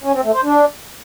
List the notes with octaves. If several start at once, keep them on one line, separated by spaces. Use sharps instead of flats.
C#4
C4
A3
C5
D4